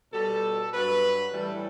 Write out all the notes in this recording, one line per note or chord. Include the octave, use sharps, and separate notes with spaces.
B2 G3 A4
G2 F#3 B4
A2 E3 G3 A4